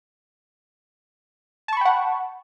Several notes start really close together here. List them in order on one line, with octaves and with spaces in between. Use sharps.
A5 C#6 B5 G5 F#5